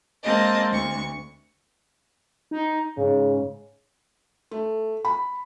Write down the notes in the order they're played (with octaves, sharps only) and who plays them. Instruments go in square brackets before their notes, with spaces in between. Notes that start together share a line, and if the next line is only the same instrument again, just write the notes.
[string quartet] G#3 A#3 C4 D#5 A5
D2 C#6
[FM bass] D#4
[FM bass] G#2 [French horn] C#3
[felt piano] A3
B5